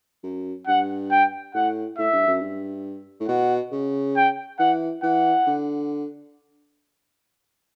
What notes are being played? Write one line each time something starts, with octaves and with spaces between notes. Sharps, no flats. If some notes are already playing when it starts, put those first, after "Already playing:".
F#2
G2 F#5
G5
A2 F#5
A2 E5
G2
F#2
G2
A2
B2 F#5
C#3
G5
E3 F#5
E3 F#5
D3